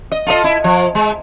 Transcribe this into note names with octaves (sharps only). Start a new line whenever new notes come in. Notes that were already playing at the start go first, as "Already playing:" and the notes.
D#5
F4 A4 D#5
E4
F3
G#3